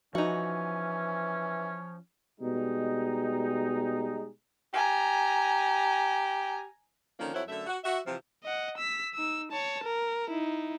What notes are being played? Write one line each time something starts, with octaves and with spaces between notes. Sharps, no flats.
E3 F3 C#4 D#4 F#4
B2 G3 G#3 D#4
G4 G#5 A#5
D3 D#3 F3 A#3 C#4
F2 F#3 E4 C5 C#5 F#5
F#2 D3 A3 E5
F#4
F#4 E5
C3 E3 F3
D#5 F#5
E6 B6
D#4 E6
C#5 A5
A#4
D#4 E4